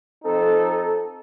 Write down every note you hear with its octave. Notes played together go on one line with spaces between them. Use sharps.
F3 C4 D#4 A4